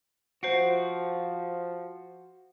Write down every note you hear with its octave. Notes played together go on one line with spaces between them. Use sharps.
F3 F#4 C5 C7 D7